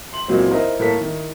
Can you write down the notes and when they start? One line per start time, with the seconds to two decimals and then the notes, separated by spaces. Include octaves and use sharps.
0.13 C6 F#7
0.28 C#2 A#2 E3 F#3 C4
0.49 D#4 E4 A#4 C5 D#5 E5
0.79 A2 A#3 A4 A#4 C#5 B6
0.96 D#3 E4